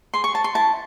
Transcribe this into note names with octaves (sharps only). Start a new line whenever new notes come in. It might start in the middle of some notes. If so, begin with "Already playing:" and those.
G#4 C6
C#6
C#5 A5
C6
E4 A5